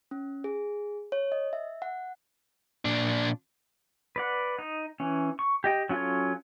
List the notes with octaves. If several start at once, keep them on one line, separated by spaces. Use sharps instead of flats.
C#4
G#4
C#5
D#5
E5
F#5
A#2 D4
B4 D5 F#5
D#4
E3 C#4
C#6
G4 D#5 G5
F#3 C#4 F4 A4 C#5